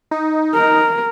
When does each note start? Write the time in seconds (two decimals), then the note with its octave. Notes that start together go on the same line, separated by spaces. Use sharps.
0.11 D#4
0.54 A#4